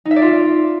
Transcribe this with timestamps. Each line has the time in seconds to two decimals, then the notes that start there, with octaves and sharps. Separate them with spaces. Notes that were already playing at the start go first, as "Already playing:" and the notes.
0.05 D#4
0.11 E5
0.16 D5
0.22 F4